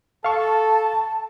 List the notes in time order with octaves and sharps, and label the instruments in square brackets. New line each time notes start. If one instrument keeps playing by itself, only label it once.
[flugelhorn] A4 [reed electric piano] F5 C#6 [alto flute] A5